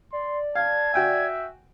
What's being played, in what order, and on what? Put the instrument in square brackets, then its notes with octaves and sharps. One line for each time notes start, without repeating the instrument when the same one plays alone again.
[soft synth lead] D5 [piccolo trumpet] C6
[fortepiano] F5 [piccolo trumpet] A5 [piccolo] G#6
[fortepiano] F#4 G5 G#5 [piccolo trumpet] E5